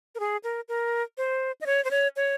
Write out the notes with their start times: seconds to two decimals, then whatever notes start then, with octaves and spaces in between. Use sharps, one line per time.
0.15 A#4
0.20 G#4
0.44 A#4
0.68 A#4
1.18 C5
1.61 D#5
1.66 C#5
1.85 C5
1.91 C#5
2.16 C#5